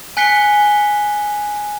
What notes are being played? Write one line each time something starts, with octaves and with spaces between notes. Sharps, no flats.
G#5 F#6 B6 C#7 G7